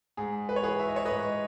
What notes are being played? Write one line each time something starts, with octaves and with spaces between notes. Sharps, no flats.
G#2 G#4
B4
C#5
E3 G#4 B4
E5
D#5
C#5
B4 D#5
G#2